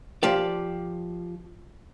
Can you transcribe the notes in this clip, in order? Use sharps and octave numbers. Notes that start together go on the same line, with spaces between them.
F3 G4 D5